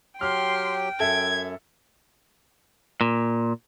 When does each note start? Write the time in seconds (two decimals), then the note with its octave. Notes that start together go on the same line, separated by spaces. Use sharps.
0.21 F#3 G4 G5 C6 F6
1.00 F#2 A4 E5 G#6
3.01 A#2